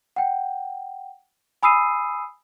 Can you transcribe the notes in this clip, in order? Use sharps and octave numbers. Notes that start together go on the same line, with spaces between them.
F#5 G5
G#5 B5 D#6 E6 C7 D#7